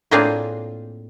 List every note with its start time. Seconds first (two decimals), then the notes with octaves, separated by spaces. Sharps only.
0.11 A2 A#3 C4 D4 F4 G#4